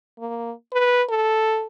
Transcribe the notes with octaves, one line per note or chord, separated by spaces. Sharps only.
A#3
B4
A4